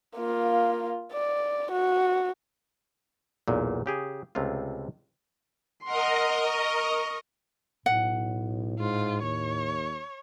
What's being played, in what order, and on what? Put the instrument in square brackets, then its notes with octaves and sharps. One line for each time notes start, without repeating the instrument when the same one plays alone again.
[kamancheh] A#3 F4
D5
F#4
[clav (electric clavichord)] B1 E2 A#2
C#3 G4 G#4
C#2 C3 A3 F4
[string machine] A#4 D#5 [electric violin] F#5 C6
[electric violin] C#6
[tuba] B1 [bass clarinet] A2 [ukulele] F#5
[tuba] G#2 [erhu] F4
[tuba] D#2 [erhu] C#5